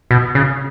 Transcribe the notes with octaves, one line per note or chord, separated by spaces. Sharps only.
B2
C#3